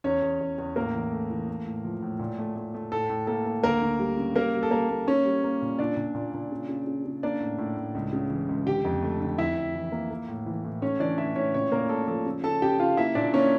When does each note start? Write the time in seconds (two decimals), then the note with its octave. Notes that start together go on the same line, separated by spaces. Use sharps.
0.04 E2 C#4 C#5
0.22 E2
0.41 E2
0.58 E2
0.76 A2 A#3 A#4
0.94 E3
1.12 A3
1.30 E3
1.48 A3
1.66 A2
1.84 F3
2.03 A2
2.19 A#2
2.38 A3
2.56 A3
2.74 A3
2.92 A2 A4
3.10 A2
3.27 A#3 A4
3.45 A#3
3.63 D2 A#3 A#4
3.81 D2
3.99 G3
4.17 C#3
4.35 G3 A#3 A#4
4.54 G3
4.63 A4
4.71 G3 A#3 A#4
4.89 A#3
5.07 A#3 C#4 C#5
5.25 G3
5.44 A#3
5.62 A#2
5.79 A#2 D4 D5
5.97 A#2
6.15 A#2
6.34 A#2
6.52 C#3
6.69 C#3
6.87 C#3
7.05 C#3
7.23 A#3 D4 D5
7.40 A2
7.58 A2
7.77 A2
7.95 C#2
8.13 C#3
8.30 E3
8.49 C#2
8.66 D3 G4 G5
8.85 F2
9.03 A3
9.21 D3
9.38 F2 E4 E5
9.57 F2
9.75 E3
9.92 A#3
10.11 A#3
10.28 A2
10.46 E3
10.64 A2
10.82 A3 C#4 C#5
11.00 E3 D4 D5
11.18 A2 E4 E5
11.36 A2 C#4 C#5
11.54 A#2 C#4 C#5
11.72 A#2 A#3 A#4
11.89 A3 A4
12.08 F3 A4
12.26 C#3
12.43 C#3 A4 A5
12.62 C#3 G4 G5
12.79 C#3 F4 F5
12.97 A#3 E4 E5
13.15 A#2 D4 D5
13.34 A#3 C#4 C#5